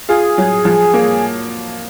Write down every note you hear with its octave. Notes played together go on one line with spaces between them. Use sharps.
F4 G#4
F#3
F3
A#3